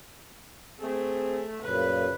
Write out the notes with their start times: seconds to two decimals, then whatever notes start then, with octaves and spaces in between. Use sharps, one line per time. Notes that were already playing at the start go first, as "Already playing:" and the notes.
0.80 A3 C4 G#4
1.62 F#2 A#2 C#3 B4